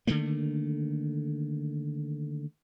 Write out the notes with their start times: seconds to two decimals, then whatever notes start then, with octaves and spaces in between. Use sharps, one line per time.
0.07 D3 D#3 A3 A#3